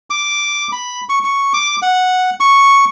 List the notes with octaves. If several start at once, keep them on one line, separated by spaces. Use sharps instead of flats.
D6
B5
C#6
C#6
D6
F#5
C#6